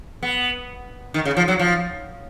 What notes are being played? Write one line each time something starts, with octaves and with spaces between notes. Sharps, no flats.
B3
D#3
C#3
F3
F#3
F3